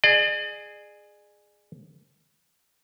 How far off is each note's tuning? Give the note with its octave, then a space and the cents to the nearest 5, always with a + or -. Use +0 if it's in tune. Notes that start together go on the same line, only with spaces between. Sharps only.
G#4 +0 D5 +45